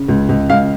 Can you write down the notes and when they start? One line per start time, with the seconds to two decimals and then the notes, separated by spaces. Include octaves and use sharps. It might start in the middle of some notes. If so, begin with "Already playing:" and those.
Already playing: C#3
0.08 C#2
0.29 C#2
0.50 C#2 F5